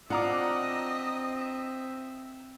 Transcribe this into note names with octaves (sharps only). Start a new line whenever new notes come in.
C4 D4 F4 D#5 E5 F#5 A#5 D6